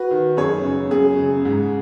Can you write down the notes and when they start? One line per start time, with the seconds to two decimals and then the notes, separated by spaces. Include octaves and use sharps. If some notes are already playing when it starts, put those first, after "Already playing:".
Already playing: F#4 B4
0.11 D#3
0.37 F#2 G#4 C#5
0.64 C#3
0.91 F#2 G#4
1.19 C#3
1.45 G#2